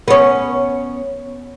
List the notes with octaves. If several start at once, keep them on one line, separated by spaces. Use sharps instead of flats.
B3 C#4